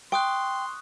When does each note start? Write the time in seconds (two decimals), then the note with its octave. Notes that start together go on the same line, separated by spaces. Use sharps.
0.12 G5 C6 C#6 D#6 F#6